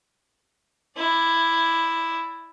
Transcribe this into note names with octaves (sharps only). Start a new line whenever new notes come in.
E4 D5